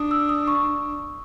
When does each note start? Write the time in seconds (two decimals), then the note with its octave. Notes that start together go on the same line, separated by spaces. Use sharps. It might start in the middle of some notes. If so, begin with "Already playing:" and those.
Already playing: D4 D#6
0.11 E6
0.29 D#6
0.48 C#6